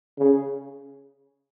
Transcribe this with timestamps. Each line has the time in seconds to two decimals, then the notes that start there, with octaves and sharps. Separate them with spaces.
0.18 C#3